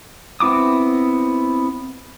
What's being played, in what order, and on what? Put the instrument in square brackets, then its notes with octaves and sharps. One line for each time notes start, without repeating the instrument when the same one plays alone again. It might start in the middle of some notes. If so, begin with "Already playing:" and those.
[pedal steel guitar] B3 C4 E4 D6 D#6